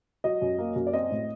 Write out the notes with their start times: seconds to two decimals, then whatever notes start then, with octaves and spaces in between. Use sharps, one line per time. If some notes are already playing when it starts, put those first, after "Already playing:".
0.24 F#3 D#5
0.42 F#2
0.58 A#3
0.76 F#2
0.87 D5
0.93 C4 D#5
1.11 A2